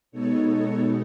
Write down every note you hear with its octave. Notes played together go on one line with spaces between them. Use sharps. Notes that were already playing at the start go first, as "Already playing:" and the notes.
B2 G#3 B3 D#4 A4 C#5
A4 C#5